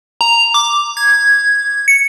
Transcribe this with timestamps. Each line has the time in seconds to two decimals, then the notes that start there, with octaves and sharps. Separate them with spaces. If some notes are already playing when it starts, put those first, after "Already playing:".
0.21 A#5
0.54 D6
0.97 G#6
1.88 C#7